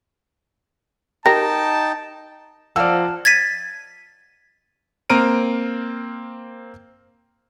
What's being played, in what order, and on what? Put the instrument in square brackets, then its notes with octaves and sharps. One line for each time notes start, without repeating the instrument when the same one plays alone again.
[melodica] D#4 G5 [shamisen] G4 A#4 [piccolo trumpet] A5 [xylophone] A#6
[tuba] F3 [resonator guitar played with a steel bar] A#3 C4 [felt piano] D5 E6 [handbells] F#5 A5 F6
[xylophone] G#6 A6 B6 D#7
[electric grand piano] A#3 C4 A#5 F6 D7 D#7